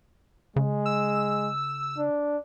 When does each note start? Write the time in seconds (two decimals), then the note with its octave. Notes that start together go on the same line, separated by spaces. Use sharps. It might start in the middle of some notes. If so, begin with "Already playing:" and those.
0.56 C#3 G#3
0.86 E6
1.98 D4